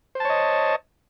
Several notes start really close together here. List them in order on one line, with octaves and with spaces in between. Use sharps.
C5 A5 C#5 D#5